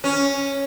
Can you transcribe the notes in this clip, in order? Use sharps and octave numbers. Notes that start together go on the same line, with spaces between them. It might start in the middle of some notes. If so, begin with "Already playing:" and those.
C#4